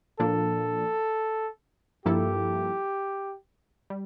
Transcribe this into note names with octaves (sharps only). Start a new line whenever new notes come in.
A#2 F3 A#3 D4 A4
G2 F3 A#3 E4 G4 A4
G3